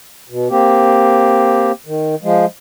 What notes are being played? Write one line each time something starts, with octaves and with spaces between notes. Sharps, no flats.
B2
A#3 C4 G4
D#3
F3 G#3